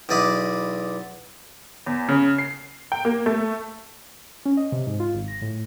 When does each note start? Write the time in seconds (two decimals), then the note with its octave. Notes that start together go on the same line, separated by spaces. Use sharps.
0.09 B1 E2 D5 D#5 B5
1.86 E2
2.08 C#3
2.38 C7
2.92 G5
3.05 A#3
3.26 A3
4.45 C#4
4.57 D#5
4.72 C3
4.87 G#2
5.00 F4
5.14 G#1
5.28 A#6
5.42 A2